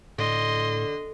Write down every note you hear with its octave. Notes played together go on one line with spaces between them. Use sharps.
A2 D3 D#5 C6